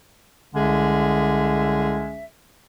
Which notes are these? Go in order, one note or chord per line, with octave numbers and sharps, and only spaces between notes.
C2 D3 G#3 C#4 G#4 E5